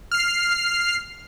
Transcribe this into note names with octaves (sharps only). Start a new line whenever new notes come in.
F6 C7